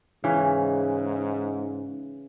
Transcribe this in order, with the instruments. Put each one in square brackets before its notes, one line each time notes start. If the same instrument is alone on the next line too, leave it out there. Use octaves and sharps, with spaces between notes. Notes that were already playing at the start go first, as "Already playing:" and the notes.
[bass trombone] G#2 [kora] C#3 E3 C#4